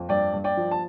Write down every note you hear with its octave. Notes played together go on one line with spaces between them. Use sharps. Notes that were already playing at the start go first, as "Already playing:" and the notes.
Already playing: F2
G2 D5 G5
G2
D5 G5
F3
A5